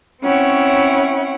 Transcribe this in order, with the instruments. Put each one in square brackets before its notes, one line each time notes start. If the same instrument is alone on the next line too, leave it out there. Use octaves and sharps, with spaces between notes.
[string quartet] C4 C#4 E4 C#5 F#5 G5